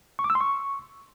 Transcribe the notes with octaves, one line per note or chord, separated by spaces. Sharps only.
C#6
D6
E6
C6
C#6